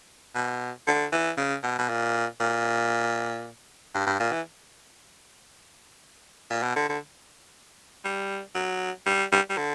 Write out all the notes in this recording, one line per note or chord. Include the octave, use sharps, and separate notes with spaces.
B2
D3
E3
C#3
B2
B2
A#2
A#2
G2
G2
A#2
E3
A#2
B2
D3
D3
G3
F#3
G3
G3
G3
D3